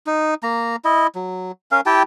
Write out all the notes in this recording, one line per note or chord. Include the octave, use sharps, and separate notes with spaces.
D#4
A#3 A#5
E4 D#5
F#3
C#4 A#4 F5
E4 G4 G5 A5